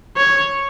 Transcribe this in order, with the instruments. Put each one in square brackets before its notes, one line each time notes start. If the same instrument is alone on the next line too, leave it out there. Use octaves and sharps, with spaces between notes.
[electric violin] C#5